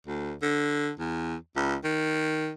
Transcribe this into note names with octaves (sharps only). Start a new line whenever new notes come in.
D2
D3
E2
C#2
D#3